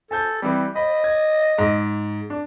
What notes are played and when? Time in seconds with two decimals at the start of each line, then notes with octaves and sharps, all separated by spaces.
0.11 A4 G#5 A5 G6
0.42 E3 G3 C4
0.76 D#5 B5
1.04 G#6
1.58 G#2
2.30 D4